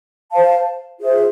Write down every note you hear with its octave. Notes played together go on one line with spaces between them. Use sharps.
C5 F5 A5
F4 G#4 C5 E5